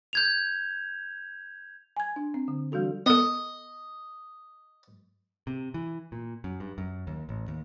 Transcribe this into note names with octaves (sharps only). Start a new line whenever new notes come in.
G6 G#6 F7
G#5 G#6
D4
C4
D3
E3 G3 D4 F#4 A4
B3 A4 D#5
C3
E3
A#2
F#2
G2
F#2
D#2
A1
D#2